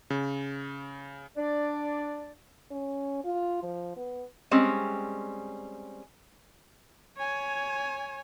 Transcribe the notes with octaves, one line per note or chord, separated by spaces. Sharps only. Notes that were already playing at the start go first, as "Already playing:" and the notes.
C#3
D4 D5
C#4
F4
F3
B3
G3 G#3 C4 C#4
C#5 G#5